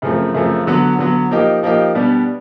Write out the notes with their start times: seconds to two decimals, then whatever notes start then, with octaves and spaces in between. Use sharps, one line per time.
0.02 F#2 C#3 F3 A3 C4
0.34 F#2 C#3 F3 A3 C4
0.67 D3 F#3 B3
0.99 D3 F#3 B3
1.31 F3 A#3 D#4 G4
1.63 F3 A#3 D#4 G4
1.95 B2 G3 B3 D4